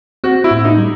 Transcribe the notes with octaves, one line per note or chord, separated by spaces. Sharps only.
C4 F#4
E4
A2
D#4
G3